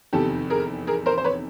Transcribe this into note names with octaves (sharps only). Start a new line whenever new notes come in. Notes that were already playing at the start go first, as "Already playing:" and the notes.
F1 E2 C3 D#3 G4 A4
G#4 A#4
G#4 A#4
A#4 C5
C5
B4 C#5